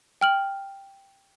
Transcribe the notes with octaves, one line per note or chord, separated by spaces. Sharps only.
G5 F6 F#7